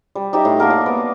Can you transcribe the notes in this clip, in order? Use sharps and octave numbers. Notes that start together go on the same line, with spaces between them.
G3
D#4 G4 D5 E5
A2
A#3 A4 A#4 F#5
D5
B3